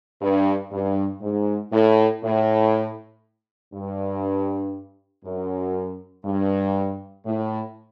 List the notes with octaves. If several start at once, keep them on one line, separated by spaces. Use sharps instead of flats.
G2
G2
G#2
A2
A2
G2
F#2
G2
A2